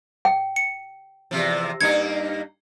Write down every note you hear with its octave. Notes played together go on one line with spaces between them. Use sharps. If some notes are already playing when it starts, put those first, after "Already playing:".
G5
C#7
E2 C3 F3
G2 A#3 D#4 G#6 C#7